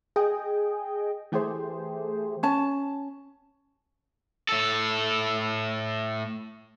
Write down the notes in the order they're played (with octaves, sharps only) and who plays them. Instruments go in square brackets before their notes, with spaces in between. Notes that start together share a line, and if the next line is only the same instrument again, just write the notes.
[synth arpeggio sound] G#4 D#5 G5
E3 A3 G4 G#4 C5
[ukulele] C#4 A5
[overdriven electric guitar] A2 A4